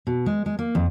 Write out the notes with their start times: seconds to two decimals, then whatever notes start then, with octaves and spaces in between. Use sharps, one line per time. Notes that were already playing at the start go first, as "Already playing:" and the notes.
0.07 B2
0.26 G#3
0.46 G#3
0.59 A#3
0.75 F2